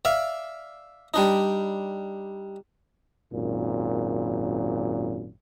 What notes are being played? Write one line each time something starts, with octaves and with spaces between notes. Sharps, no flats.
D5 E5 F5
G3 D4 D#4
G#1 F#2 A#2